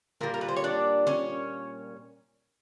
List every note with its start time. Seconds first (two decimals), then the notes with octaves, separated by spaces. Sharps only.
0.21 A#2 G3 A#3 A#4
0.34 A#4
0.41 B4
0.49 C5
0.56 C#5
0.64 D4 D5
1.07 C#4 C#5